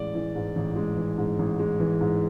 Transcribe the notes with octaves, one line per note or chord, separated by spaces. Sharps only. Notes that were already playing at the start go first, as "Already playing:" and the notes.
Already playing: A1 G#3 D5
E3
G#2
A1
G#3
E3
G#2
A1
G#3
E3
G#2